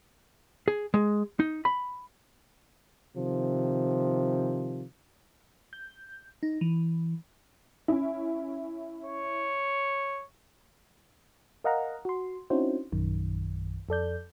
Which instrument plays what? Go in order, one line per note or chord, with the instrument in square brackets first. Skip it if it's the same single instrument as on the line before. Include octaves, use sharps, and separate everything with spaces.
[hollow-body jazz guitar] G#4
G#3
D#4
B5
[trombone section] C3 D#3 F3
[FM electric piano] G6
D#4
E3
[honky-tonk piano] C#4 E4
[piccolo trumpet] C#5
[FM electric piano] A#4 D#5 F5 F#5 A#5
F#4 C6
C4 C#4 D#4 E4 F#4 C5
A#1 F#2 D#3
F2 A4 D5 G6